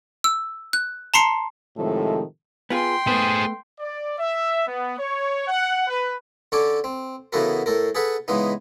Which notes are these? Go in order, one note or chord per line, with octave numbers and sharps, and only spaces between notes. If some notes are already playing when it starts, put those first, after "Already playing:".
E6
F#6
A5 A#5 C6 C7 C#7
A2 C3 D#3 F3 G#3 A4
B3 F4 G#4 G5 C6
A3 B3 G#4 C5
D5
E5
B3
C#5
F#5
B4
D3 C#4 A4 C#5 D6
C4
C#3 E3 B3 F#4 A4 A#4
A2 A4 A#4
G#4 A4 B4 F#5
C#3 E3 G#3 B3 D#4